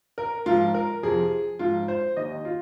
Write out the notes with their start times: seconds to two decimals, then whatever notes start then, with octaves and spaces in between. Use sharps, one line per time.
0.18 A#4
0.46 G#2 F3 F4
0.74 A#4
1.03 F2 C3 F3 G#4
1.59 G#2 F3 F4
1.88 C5
2.16 D#2 D#3 D#5
2.45 F4